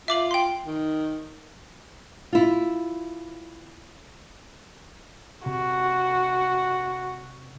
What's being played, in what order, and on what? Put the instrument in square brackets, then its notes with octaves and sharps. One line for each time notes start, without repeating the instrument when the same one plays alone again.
[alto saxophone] F4 [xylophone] E5 D6 F#7
[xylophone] G5 C6
[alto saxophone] D#3
[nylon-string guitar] E4 F4
[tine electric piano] C3 [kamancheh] F#4